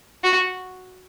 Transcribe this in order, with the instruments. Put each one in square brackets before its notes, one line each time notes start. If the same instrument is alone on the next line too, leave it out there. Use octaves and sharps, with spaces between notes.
[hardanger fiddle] F#4